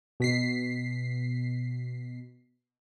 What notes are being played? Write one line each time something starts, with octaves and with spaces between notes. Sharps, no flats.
B2 B6 C7